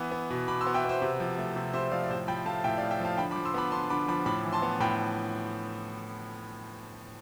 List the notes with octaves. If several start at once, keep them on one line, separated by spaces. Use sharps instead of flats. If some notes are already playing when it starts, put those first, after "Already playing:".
Already playing: E3 B3
B3
B2
B2 B5 D6
C6 E6
B3
E5 G5
B3 C5 E5
C3
F3
A3
C3
C3 C5 E5
F3 D5 F5
D5
A2 C5
F3 G5 B5
A3 F5 A5
A2 E5 G5
D5 F5
A2
E5 G5
F3 F5 A5
D3 G5 B5
B5 D6
F3
C6 E6
B3 B5 D6
D3 A5 C6
D3 B5 D6
F3 B5 D6
A2 B5 D6
E3
A5 C6
B3
A2 G5 B5